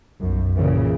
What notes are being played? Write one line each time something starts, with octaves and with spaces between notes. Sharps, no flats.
B1 F#2
A#2 C#3 E3